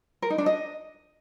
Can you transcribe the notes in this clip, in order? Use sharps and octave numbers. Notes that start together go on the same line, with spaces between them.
A#4
D#4
D4
D#5